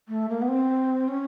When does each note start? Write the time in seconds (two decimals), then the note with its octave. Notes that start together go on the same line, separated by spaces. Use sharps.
0.09 A3
0.29 A#3
0.42 B3
0.48 C4
1.08 C#4